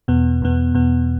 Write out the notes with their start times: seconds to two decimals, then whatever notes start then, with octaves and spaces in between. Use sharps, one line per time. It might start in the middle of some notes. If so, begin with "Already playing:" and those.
0.08 E2 B2 B3
0.42 E2 B2 B3
0.74 E2 B2 B3